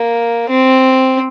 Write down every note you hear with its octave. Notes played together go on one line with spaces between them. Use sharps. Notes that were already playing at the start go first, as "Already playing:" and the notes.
Already playing: A#3
C4